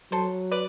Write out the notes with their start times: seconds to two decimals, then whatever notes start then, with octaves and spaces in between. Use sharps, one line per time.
0.12 F#3 A4 C5
0.51 B4 D5